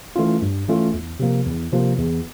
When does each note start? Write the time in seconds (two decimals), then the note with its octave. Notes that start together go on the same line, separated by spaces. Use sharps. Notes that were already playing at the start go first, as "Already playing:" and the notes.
0.16 E3 A3 C#4 F4
0.42 G2
0.68 E3 A3 C#4 F4
0.94 E2
1.20 C3 F3 A#3
1.46 E2
1.72 C3 F3 A#3
1.99 E2